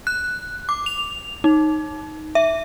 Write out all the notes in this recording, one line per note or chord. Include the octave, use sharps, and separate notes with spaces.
F#6
D6
F7
D#4
E5